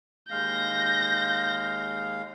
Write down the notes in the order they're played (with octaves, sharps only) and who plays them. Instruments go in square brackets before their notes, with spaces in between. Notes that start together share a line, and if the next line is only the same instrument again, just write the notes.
[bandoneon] D#2 G#3 F5 [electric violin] G6 A#6